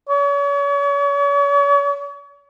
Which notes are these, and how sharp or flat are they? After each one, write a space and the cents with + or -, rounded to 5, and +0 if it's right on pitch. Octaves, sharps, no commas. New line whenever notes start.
C#5 +40